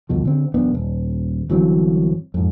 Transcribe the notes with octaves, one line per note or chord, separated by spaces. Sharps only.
G1 D2 B2 F3
D3 C4
E1 B1 B3 D4
D#1
G1 E3 F#3 C4
F2 G#2